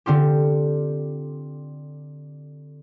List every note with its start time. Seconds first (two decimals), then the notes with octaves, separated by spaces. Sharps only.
0.06 D3 C4 F4 G4